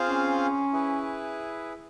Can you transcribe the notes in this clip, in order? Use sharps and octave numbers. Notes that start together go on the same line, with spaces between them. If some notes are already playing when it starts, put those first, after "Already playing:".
Already playing: C4 F4 G#4 C5 F5
C#4
E4 G#4 B4